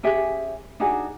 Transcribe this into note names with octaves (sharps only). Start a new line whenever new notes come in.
C#4 G4 G#4 E5
D4 D#4 F#4 G#4